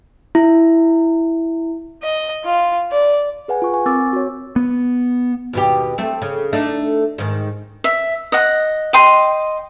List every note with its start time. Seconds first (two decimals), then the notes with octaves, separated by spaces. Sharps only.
0.35 E4
2.03 D#5
2.45 F4
2.92 D5
3.48 G#4 B4 F#5 G#5
3.62 F4 C#6
3.74 G#5 C#6
3.86 C4 A#4 C#6 D6 E6 A6
4.13 F#4 C#5
4.56 B3
5.53 D#2 B2 G4
5.98 A3 C4
6.22 C#3
6.53 A3 D4 D#4
7.18 G#2 D#3
7.84 E5
8.32 D#5 F#5
8.93 D#5 G5 C6